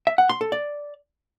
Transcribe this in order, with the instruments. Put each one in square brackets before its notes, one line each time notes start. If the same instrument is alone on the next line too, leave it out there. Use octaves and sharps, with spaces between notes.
[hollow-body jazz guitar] E5
F#5
C6
A4
D5